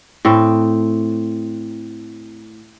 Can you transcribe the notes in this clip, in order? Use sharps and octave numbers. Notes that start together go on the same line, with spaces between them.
A2 C4